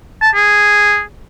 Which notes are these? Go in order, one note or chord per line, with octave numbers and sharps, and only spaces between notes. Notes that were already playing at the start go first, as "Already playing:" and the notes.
A5
G#4